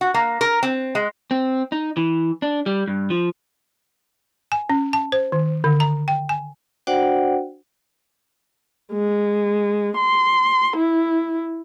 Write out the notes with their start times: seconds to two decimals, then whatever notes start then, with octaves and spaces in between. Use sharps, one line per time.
0.01 F#4
0.14 A#3
0.41 A#4
0.63 C4
0.95 G#3
1.31 C4
1.72 D#4
1.97 E3
2.42 D4
2.66 G3
2.88 G2
3.10 F3
4.52 G#5
4.70 C#4
4.93 A5
5.12 C5
5.32 D#3
5.64 D3
5.80 A#5
6.08 G5
6.29 G#5
6.87 D4 F#4 C5 D5 F#5 G5
8.92 G#3
9.97 C6
10.76 E4